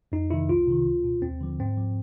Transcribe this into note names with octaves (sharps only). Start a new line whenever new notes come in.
F2 D#4
C3 D#3 E4
C2 F4
C3 D#3
C#2
B2
D#2 C4
D3 F3
G#2 C4
F3